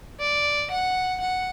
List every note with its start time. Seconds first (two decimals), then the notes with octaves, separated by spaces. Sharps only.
0.20 D5
0.71 F#5
1.21 F#5